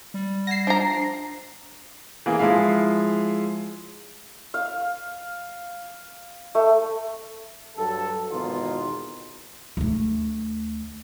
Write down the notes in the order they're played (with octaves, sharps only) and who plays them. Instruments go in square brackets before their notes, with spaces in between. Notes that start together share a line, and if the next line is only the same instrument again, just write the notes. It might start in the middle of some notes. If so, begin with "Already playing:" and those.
[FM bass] G3
[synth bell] F#5 G#6 E7 [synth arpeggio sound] A#6 C7
[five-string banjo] F3 A#5 [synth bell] D4
[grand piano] E3 A#3 G#4
F3 G#3 E4 F5
[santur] F5
A3
[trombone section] G2 F#3 A4
G#1 E2 B2 D#4 F4
[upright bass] D2 A3